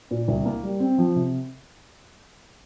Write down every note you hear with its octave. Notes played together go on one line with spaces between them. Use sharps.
A#2
C2
A#3
G3
C4
F3
C3